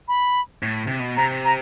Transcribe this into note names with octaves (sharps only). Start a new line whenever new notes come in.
B5
A2
C3
B2
C3 A#5
A#5